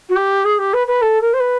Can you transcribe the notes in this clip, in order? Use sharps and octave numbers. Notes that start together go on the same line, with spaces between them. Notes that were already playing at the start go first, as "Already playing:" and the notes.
F#4
G4
G#4
G4
B4
B4
A4
A#4
C5
B4